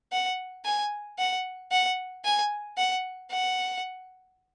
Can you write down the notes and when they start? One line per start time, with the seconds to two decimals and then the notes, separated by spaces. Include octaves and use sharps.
0.12 F#5
0.65 G#5
1.19 F#5
1.72 F#5
2.25 G#5
2.78 F#5
3.32 F#5